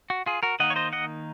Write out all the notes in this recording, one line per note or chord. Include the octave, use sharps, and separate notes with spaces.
F#4
F4 G#4
F#4 A#4
D#3 A#3 D#4 D#5 F#5
C#5
C5 D#5
D#5 F#5